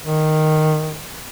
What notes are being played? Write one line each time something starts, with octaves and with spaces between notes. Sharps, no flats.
D#3